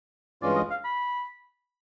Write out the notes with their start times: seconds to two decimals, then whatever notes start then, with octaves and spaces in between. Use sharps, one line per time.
0.42 G2 E3 G#3 C#4 F4 D5
0.56 D#5
0.70 F5
0.85 B5